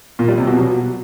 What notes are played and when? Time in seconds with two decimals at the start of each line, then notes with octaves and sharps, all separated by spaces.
0.19 A#2
0.28 G3
0.38 C3
0.47 B2
0.57 F#3